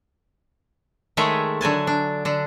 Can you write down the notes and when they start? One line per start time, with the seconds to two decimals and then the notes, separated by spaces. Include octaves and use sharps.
1.17 D#3 G#3 A3 G#4 C#5 E5
1.61 D3 F#3 G#5 A5
1.87 D4
2.25 D3 D4